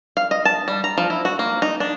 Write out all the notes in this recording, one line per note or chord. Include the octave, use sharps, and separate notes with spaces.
F5
D#5
A5
G3
A#5
F3
E4
F#4
A#3
D#4
D4